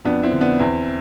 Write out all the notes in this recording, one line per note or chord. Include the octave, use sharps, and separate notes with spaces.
F2 B3 D4
C4 E4
D3
B3 D4
E2 C4 E4